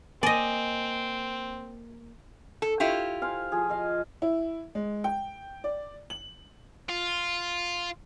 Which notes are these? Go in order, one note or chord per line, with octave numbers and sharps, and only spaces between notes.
A#3 C4 D5 D#5 G#5
A4
E4 F4 G4
C5 F5 G#5
F3 G#4
D#5 F5
E4
G#3
G5
D5
F#7
F4